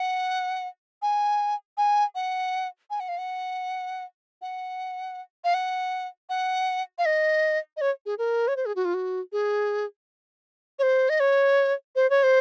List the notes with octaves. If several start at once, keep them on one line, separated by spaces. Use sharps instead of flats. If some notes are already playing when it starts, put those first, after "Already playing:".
Already playing: F#5
G#5
G#5
F#5
G#5
F#5
F5
F#5
F#5
F5
F#5
F#5
F5
D#5
D#5
C#5
G#4
A#4
C#5
C5
G#4
F#4
F4
F#4
G#4
C#5
C5
D#5
C#5
C5
C#5
C5